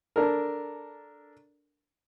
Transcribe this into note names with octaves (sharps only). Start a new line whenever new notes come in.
D4 A4 A#4